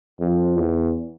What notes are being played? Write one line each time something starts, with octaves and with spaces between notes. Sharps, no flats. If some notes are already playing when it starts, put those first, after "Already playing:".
F2
E2